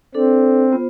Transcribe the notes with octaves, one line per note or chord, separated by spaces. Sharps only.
C4 D4 A4 D5
B3 F4 C5